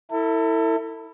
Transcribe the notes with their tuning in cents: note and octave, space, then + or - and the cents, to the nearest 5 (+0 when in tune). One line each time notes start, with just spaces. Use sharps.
E4 -10 A4 +35